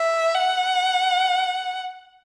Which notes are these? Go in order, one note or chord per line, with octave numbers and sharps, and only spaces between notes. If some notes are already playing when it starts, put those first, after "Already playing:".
Already playing: E5
F#5